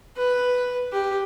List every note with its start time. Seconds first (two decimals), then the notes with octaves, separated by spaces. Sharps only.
0.16 B4
0.93 G4